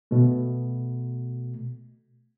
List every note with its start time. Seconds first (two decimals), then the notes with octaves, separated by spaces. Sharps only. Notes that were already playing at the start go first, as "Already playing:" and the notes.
0.11 B2 A3